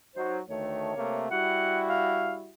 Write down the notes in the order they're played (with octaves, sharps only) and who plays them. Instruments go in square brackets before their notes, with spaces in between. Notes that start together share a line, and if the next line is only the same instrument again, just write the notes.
[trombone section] F#3 D#4 [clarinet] C5
[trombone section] D2 D#3 A3 [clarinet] C#5
[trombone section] C3 A3 A#3
[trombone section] G3 E4 F#4 [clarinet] F#5
[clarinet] F5